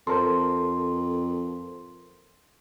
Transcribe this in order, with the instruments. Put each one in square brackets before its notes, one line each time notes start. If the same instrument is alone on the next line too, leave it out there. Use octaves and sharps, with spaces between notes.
[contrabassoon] F2 [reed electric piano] A4 A#4 C5 [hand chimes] C6